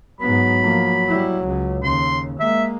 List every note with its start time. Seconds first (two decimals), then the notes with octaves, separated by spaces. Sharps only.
0.21 G#2 F#3 B3 B5
0.63 F3 A#3
1.08 G3 E4
1.44 C#2 C#3
1.83 D#2 C#3 C6
2.40 G#3 A#3 E5